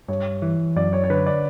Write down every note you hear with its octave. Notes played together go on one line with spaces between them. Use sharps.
G2 C#5
E3
F#2 D5
C#5
C#5
D3 B4
D5